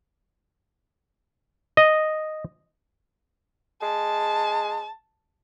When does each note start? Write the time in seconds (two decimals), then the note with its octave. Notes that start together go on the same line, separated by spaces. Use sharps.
1.77 D#5
3.82 G#3 A5